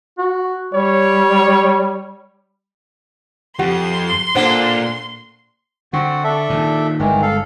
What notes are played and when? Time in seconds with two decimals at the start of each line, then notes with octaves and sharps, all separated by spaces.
0.18 F#4
0.74 G3 C#5
3.59 F2 G4 F#5 C6
4.35 A#2 A#3 D4 A4 C5 F#5
5.93 D3 C4 F#4 F#5
6.24 D4 A4 E5
6.50 A#2 D#3
6.99 G1 D#3 E3 G#3
7.22 A4 F5